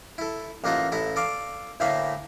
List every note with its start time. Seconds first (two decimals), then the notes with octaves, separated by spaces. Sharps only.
0.18 E4 A4
0.64 A1 A#3 D#4 F4 A4 F#5
0.92 A1 E4 A4 A#5
1.16 A4 D5 F5
1.80 D2 A2 A3 A#3 F5 B5